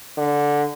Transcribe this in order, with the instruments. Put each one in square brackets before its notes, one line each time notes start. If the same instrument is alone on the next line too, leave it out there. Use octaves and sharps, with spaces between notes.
[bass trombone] D3